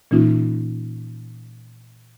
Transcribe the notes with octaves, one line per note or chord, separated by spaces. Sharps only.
A#2 E3 A#3 C#4 D#4 F4